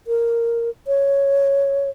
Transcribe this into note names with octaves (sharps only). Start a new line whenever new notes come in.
A#4
C#5